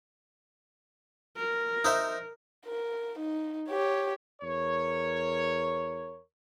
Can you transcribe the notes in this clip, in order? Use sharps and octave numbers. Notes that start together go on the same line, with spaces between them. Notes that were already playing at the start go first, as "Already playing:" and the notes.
A#4
D#4 C5 E5
A#4
D#4
G4 C#5
E2 A#4 C#5